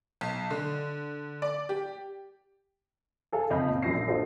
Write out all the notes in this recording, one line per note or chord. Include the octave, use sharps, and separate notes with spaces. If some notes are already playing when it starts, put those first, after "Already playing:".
B1
D3
D5
G4
G#4 A4 F5 G#5
F#1 F2 D#5 F5 B5 G6
A#2
F#2 F3 A#6 C7
A#1
D4 F4 F#4 A4 C5 D#5